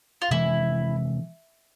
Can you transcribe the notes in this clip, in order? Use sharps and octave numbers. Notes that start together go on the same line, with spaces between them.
F4
C3 E3 G#3 E4